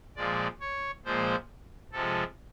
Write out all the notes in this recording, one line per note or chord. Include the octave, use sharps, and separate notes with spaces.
A#2 F3 G#3 D5
C#5
A#2 F3 G#3 C5
C3 F3 G#3 A4